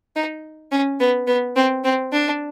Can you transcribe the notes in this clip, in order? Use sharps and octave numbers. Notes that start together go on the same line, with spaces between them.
D#4
C#4
B3
B3
C4
C4
D4